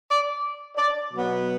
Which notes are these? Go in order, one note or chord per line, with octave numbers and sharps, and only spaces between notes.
D5
D5
B2 F#3 B3